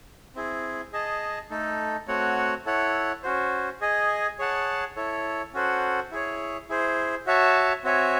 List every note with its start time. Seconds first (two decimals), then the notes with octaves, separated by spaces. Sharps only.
0.35 C4 E4 G#4
0.93 G#4 D#5 A5
1.50 A3 D#4 A4
2.08 A3 C4 F#4 C#5 F#5
2.65 E4 A4 C#5 F#5
3.23 C#4 F#4 C5
3.81 G#4 D#5 G#5
4.38 G#4 C#5 F#5 A5
4.96 E4 A4 C#5
5.53 C#4 F#4 A4 C5 F#5
6.11 E4 G#4 C#5
6.69 E4 G#4 C5
7.26 F#4 C#5 E5 A5
7.84 C4 F#4 C#5 E5 G#5